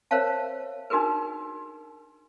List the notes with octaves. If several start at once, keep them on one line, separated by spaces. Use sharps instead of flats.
A#4 C5 C#5 E5 F5 A5
D4 D#4 F#4 G#4 A#4 B4